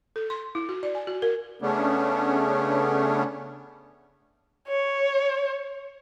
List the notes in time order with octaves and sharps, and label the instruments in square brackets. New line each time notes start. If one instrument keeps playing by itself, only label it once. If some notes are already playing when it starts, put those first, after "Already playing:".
[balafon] A4
C6
E4
F#4
D5
G#5
F#4
A#4
[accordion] C#3 A3 B3 C#4 D4
[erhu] C#5